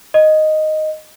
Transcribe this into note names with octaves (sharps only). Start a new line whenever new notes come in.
D#5